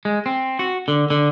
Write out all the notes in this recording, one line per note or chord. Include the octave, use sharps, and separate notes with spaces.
G#3
C4
F#4
D3
D3